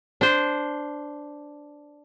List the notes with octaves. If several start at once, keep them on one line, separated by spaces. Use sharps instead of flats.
D4 C5